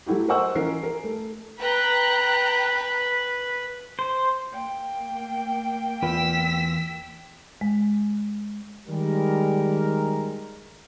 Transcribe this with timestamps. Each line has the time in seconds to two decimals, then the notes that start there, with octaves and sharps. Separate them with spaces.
0.06 F#3 A3 E4 F#4 G4
0.28 A#4 C5 D#5 F#5 C#6 E6
0.55 E3 F3 C#4 A#4 C7
0.83 A#4
1.04 A3
1.59 B4 G5 A#5 F#6
3.99 C5
4.53 A#3 G5
6.02 E2 F4 B4 E6 B6
7.61 G#3
8.88 D#3 G3 G#3 A#4